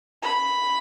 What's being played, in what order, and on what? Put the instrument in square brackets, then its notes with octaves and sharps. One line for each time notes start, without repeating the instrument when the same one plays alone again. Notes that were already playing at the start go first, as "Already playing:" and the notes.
[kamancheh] B5